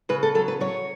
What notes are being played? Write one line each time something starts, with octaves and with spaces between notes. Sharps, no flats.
C#3 B4
A4
F#3 A4
B4
F#3 C#5